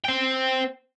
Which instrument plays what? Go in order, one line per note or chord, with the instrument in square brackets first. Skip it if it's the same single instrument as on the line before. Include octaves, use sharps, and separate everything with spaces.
[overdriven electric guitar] C5 G5